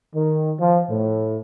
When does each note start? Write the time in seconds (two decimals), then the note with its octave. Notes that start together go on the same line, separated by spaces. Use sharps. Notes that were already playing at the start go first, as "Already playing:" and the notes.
0.15 D#3
0.58 F3
0.89 A2